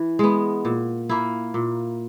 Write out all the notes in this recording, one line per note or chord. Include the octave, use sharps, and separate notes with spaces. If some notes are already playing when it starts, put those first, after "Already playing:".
Already playing: E3
G#3 B3
A#2
A#3 E4
A#2